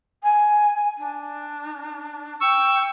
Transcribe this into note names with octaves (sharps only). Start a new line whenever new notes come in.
G#5
D4
G5 C#6 E6